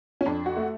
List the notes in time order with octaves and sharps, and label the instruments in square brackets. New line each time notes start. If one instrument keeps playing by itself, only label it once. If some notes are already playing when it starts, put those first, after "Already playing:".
[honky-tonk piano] C#4
F2 D4
F#4
A3